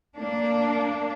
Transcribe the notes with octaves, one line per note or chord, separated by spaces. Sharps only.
A#3 D4